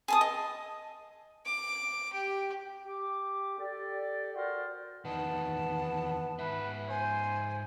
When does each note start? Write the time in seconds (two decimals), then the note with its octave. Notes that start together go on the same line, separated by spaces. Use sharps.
0.08 G#4 A5 D#6
0.21 D#5
1.45 D6
2.13 G4
2.86 G4 D6
3.59 G4 A4 D5
4.36 F#4 A#4 C5 D5
5.05 E2 D#3 B3 A5
6.39 G#2 B4 E5
6.89 C5 G#5